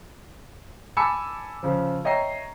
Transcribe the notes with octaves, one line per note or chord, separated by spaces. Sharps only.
G#5 A5 B5 D6 E6 C#7
C#3 F3
C#5 D#5 E5 G5 A#5 C7